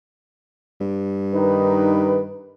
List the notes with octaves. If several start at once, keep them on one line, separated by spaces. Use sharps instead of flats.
G2
D#3 D#4 B4